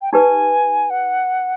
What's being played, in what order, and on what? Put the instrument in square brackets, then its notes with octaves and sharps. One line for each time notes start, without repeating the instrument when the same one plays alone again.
[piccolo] G5
[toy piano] D#4 G4 B4 [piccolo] G#5
[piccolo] F#5